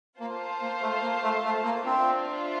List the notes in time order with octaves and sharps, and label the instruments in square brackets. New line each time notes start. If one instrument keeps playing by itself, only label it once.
[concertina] A#3 [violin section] F4 C5 F5 A5
[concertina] A#3
A3
A#3
A3
A3
A#3
[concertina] C4 [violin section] D4 F4 C5 E5